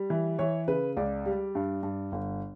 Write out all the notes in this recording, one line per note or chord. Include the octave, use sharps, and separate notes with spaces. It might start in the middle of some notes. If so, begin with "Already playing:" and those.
Already playing: G3
E3
E3 C#5
C#3 B4
C#2 D5
G3
G2
G2
G1